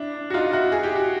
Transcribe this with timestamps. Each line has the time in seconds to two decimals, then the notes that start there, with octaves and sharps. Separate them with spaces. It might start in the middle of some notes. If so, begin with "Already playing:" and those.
Already playing: D4 E4
0.30 F#4
0.34 D#4 F4
0.53 E4 F#4
0.72 G#4
0.83 G4
0.95 F#4